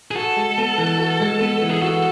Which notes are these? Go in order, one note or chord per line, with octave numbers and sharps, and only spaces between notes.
G#4
F#4 A4
G#3
B3
E3
F#4
G#3
B3
E3
G#4
F#4 A4